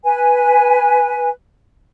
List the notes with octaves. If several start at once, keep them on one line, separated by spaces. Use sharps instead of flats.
B4 G#5